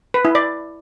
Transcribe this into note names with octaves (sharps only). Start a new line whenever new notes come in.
B4
E4
D5